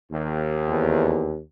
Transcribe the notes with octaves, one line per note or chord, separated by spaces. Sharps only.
D#2
E2